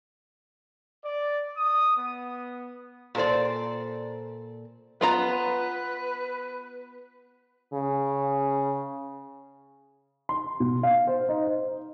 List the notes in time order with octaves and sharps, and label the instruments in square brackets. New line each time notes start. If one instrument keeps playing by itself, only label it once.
[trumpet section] D5
D#6
B3
[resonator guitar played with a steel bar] A#2 A4 C5 D5
[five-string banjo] B3 F4 A#5 [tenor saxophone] B4
[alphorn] C#3
[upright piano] C6
B2
F5
C5
D#4
C5